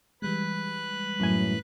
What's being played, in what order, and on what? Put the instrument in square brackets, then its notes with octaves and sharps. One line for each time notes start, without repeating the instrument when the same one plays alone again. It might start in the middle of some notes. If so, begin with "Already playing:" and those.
[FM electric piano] E3 G3 G#3 [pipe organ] B4 F#6
[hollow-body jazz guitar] F#2 A2 G#5 [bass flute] F#3